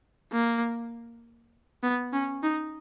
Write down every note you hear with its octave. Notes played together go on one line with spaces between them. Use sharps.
A#3
B3
C#4
D#4